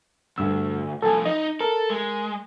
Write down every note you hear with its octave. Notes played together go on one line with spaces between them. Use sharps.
D2 G2 E6
C2 F3 A4 G#5
D#4 D#5
A4 A#4
G#3